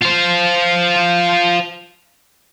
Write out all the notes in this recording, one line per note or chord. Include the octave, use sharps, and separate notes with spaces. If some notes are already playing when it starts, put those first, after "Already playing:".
F4 C5